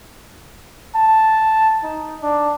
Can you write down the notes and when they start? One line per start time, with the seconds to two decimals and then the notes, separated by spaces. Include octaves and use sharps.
0.95 A5
1.84 D#4
2.22 D4